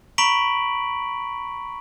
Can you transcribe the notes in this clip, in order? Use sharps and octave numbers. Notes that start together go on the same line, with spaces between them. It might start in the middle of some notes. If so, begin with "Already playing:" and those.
A#5 B5 C#6 B6 D7 F#7